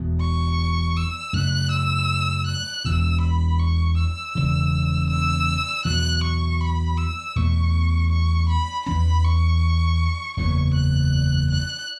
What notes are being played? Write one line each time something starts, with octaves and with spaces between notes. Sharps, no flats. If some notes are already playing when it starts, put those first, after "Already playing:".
Already playing: E1 E2 B2
C#6
E6
F#2 C#3 A3 F#6
E6
F#6
E1 E2 B2 E6
B5
C#6
E6
E1 E2 C#3
E6
E2 B2 F#3 F#6
C#6
B5
E6
E2 B2 A3 C#6
C#6
B5
E2 E3 C#4 B5
C#6
F#1 E2 C#3 E3 C#6
F#6
F#6